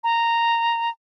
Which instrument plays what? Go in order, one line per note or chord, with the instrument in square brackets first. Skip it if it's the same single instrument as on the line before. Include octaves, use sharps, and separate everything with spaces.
[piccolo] A#5